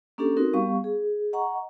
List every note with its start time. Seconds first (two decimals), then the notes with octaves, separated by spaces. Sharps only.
0.18 A#3 C#4 D4 G4 A4
0.37 C4 D#4 F#4 A#4
0.54 G3 B3 G4 F5 C#6
0.84 G#4
1.33 D#5 F#5 A#5 C#6